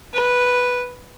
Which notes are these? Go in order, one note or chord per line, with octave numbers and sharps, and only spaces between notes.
B4